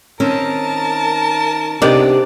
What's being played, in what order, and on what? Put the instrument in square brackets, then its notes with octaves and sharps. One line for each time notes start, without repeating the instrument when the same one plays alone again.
[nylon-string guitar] D#3 C4 C#4 [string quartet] A#4 A5
[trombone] C3 [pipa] D#3 G#3 D5 [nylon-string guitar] B3 D4